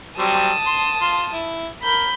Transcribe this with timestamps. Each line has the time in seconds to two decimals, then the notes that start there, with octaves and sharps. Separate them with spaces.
0.18 F#3 G3 C4 A5 D#6
0.66 C6
1.01 F4 C6
1.33 E4
1.83 A#4 B5 G6